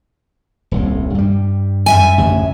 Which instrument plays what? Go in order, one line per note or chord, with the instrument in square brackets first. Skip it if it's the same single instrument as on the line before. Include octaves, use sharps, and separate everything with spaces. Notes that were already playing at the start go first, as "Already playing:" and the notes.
[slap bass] D#1 C2 A2
G2 G3
[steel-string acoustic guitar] F#2 E5 G#5
[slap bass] A1 D2 C#3